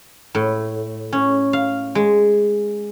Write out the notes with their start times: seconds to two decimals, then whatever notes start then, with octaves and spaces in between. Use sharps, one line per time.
0.35 A2
1.13 C#4
1.53 F5
1.95 G#3